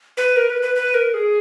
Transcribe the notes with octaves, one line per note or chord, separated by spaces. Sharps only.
B4
A#4
B4
B4
B4
A#4
G#4